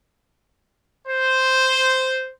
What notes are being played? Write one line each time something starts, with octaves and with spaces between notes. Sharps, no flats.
C5